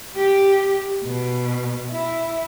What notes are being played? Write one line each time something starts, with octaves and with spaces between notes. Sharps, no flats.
G4
B2
E4